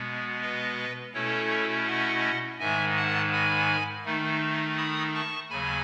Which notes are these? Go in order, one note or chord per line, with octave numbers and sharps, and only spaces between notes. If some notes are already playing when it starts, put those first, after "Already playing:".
Already playing: B2 G#3 B3
B4 D#5
B2 A3 C#4 E4 A4 C#5
D#5 F#5
G#2 D#3 G#3 E5 G#5
F#5 A5
G#5 B5
D#3 A3 D#4
B5 D#6
A5 C#6
D#2 C#3 F#3 G#5 B5